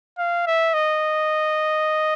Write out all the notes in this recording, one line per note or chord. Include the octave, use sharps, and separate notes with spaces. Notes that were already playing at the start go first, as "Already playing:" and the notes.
F5
E5
D#5